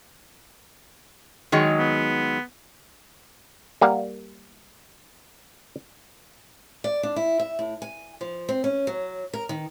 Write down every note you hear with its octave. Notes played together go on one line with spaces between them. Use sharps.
D#3 F#3 G#3
B3
G3 A#3 F5 F#5
D5
D4
E4
E5
A2
G#5
F3
C4
C#4
F#3
A#4
D#3